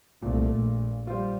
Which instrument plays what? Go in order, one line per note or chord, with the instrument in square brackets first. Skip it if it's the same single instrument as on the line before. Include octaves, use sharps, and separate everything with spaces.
[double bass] C2 A3 [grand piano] A#2
[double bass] A#1
[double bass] G3 [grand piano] F4 C5